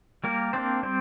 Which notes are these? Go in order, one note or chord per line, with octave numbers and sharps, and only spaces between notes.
G3 A#3 A#4
A#3 C4 D4 C5
G3 C4 C5